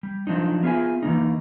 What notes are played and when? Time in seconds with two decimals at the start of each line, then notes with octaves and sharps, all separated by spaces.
0.03 G3
0.27 F3 F#3 D4 D#4
0.63 B3 F4 G#4 C5 E5 G#5
1.03 E3 F3 A#3 D#4